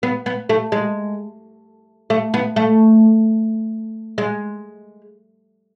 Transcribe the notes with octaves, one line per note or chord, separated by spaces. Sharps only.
B3
B3
A3
G#3
A3
B3
A3
G#3